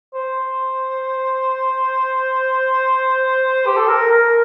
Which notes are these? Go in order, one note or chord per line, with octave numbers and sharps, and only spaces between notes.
C5
G4
A4
A#4
A#4